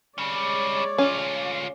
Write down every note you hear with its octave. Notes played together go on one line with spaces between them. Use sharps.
G3 G#3 C#4 C#5 D5
D2 C#4 F4